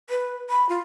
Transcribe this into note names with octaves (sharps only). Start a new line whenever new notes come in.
B4
B5
F4